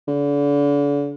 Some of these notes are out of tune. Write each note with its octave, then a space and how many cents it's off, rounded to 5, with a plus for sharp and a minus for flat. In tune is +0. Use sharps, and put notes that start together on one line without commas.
D3 -40